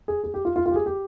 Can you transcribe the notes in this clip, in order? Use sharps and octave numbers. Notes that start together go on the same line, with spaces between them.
G#4
G#4
G4
F4
F4
F4
G4
G#4
G4